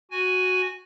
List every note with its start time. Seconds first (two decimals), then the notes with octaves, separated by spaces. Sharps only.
0.11 F#4 G#5